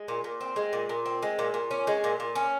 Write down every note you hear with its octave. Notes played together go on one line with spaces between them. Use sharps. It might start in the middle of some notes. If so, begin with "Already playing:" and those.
Already playing: G#3
A#2
A#2
C4
G#3
A#2
A#2
C4
G#3
A#2
A#2
C#4
G#3
A#2
A#2
C#4